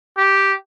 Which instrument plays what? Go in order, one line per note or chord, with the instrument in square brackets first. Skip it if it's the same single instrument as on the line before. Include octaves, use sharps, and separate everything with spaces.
[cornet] G4